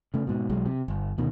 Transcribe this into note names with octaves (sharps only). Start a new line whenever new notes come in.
C#3 A3
G#2 B2
B1 F#3 G#3
C3
G1
D2 B2 D#3